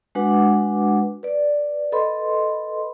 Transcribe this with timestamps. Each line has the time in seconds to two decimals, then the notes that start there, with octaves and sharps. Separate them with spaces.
0.15 G#3 D4 F#4 B4 F#5 D6
1.23 B4 D5
1.92 A4 B4 D#5 B5 C6